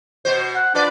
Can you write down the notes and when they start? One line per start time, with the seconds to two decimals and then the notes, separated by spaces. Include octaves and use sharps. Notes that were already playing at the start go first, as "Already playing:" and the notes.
0.25 B2 F#4 C5
0.55 F#5
0.75 D4 F4 B4 D5